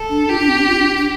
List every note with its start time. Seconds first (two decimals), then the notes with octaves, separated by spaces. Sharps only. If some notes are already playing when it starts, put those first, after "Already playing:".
Already playing: A4
0.10 D4
0.29 F4 G4
0.39 D4
0.48 C4
0.59 D4
0.68 F4
0.78 D4
0.97 D4